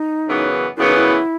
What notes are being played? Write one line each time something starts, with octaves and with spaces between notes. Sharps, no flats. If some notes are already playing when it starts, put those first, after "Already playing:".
Already playing: D#4
F#2 C#3 E3 B3
F#2 C#3 E3 B3 E4
D#4
E4